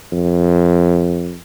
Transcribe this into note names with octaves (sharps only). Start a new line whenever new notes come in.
F2